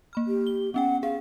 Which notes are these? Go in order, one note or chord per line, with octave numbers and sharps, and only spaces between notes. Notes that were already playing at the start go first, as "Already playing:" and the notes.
A#3 B5 F6
G4
G7
B3 C#4 F#5 G5
G#4 F5